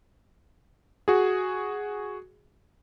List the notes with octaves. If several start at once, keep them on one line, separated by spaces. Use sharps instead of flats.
F#4 G#4